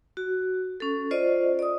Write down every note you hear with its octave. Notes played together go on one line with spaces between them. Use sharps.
F#4
C#4 A4
F4 C5 D5 D#5
D5 D#6